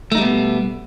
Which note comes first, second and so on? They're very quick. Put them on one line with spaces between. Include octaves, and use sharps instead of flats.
A3 D#4 G3 B3 B2